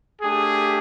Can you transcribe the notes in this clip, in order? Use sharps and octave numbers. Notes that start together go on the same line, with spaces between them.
A3 D4 G4 G#4